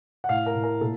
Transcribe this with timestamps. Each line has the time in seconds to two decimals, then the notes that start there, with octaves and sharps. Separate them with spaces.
0.24 F#5
0.29 A2 F5
0.46 A#4
0.55 A2
0.63 A#4
0.81 A#2 A4